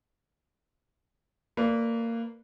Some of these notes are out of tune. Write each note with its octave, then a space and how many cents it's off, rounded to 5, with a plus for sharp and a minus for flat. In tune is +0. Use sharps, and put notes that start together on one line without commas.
A#3 -20 B4 +0 D5 +0